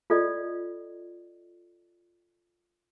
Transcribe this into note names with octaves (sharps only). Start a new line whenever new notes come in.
F4 A4 D5 D#5